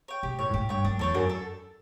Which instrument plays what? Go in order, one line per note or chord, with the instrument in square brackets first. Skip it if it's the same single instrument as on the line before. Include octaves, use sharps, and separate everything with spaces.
[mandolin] C#5 G5
[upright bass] B2 [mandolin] G4
[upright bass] A2 [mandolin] C#5 G5
[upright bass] G2
[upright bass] A2 [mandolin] G4
[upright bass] G2 [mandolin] C#5 G5
[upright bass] F#2 [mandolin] D4
[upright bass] E2 [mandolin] A4 C#5 G5
[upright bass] F#2 [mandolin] D4
[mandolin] A4